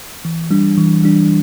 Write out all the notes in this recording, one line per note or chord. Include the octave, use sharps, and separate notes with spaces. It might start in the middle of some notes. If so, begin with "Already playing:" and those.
E3
G3 D4
E3
G3 D4